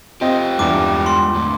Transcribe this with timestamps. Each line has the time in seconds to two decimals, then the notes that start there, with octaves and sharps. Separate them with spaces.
0.21 C4 F4 G4 D#5
0.59 E2 G2 G#3 D5 D6
1.06 C6
1.35 D2 A2